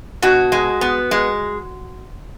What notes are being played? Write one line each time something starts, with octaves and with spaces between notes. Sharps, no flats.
B2 F#4
G#3
B3
G#3